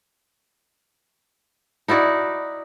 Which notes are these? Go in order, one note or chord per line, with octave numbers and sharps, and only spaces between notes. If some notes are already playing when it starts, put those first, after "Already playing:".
D#4 E4 F#4 D5